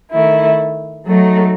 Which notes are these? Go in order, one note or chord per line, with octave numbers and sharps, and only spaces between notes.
D#3 A3 E4
F#3 A3 D#4